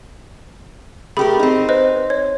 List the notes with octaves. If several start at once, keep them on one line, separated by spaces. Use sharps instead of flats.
A3 G4 G#4 A#4 B5
C4 D#4
B4 C5 D#5
C#5